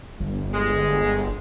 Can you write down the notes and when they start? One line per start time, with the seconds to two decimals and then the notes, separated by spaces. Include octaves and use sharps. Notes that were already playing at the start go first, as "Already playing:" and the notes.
0.20 G1
0.54 G#3